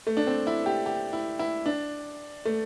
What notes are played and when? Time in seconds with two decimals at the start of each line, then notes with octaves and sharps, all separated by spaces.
0.07 A3
0.17 D4
0.27 C4
0.47 E4
0.66 G4
0.86 G4
1.13 E4
1.39 E4
1.66 D4
2.46 A3